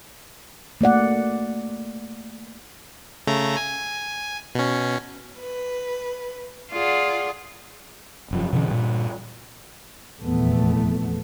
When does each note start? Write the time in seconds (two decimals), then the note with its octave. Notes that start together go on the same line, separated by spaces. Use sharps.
0.81 A3 A#3 D5 F#5
3.27 C#3 A3 A#5
3.57 G#5
4.55 B2 C#4
5.37 B4
6.73 F4 G#4 D5 F#5
8.31 F1 F#2 F3
8.53 B2 D3 E3 C#4
8.68 G2 A#2
10.23 F1 E2 A#2 A3 B3